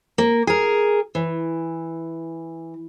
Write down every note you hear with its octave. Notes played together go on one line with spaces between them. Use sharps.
A#3
G#4 A#4
E3